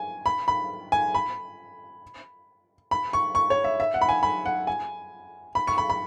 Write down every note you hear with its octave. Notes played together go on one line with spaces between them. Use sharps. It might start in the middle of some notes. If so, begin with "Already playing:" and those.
Already playing: G#5
B5
B5
G#5
B5
B5
C#6
C#6
C#5
E5
E5
F#5
B5
G#5
B5
F#5
G#5
B5
C#6
B5
B5